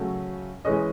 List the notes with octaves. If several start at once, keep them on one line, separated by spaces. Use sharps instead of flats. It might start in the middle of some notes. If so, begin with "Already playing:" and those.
Already playing: C#3 F#3 A3 C#4
E3 G#3 C#4 D#5